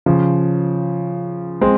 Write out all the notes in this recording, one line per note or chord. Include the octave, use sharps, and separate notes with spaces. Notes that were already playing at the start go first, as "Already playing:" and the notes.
C#3 F3
G#3 C4